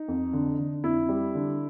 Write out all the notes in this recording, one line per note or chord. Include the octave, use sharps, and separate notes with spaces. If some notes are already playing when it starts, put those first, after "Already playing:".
Already playing: D#4
F2
D3
D3
F2 E4
G3
D3